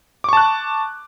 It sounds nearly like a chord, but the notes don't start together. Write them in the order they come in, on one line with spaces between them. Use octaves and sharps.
D6 C#6 A5 F#6